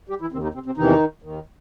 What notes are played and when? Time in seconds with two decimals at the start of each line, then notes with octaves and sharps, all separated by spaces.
0.09 G3 G4
0.21 E3 E4
0.32 D#2 C3 D#3 C4
0.43 D#3 D#4
0.54 C3 C4
0.66 C3 C4
0.77 E2 C3 D#3 E3 D#4
1.22 D#2 D#3